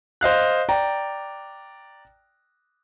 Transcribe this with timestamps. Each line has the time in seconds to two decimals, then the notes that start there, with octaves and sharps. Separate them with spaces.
0.21 C5 D#5 F5 F#6
0.69 D5 G5 A#5